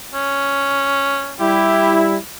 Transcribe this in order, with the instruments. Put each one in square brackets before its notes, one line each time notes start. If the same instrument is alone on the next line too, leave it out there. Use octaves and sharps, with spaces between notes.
[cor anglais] C#4
[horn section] G3 E4 [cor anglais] G4